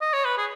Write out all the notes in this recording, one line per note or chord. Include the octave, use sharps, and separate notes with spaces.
D#5
C#5
B4
G#4